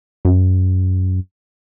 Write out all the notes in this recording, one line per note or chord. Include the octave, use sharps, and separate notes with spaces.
F#2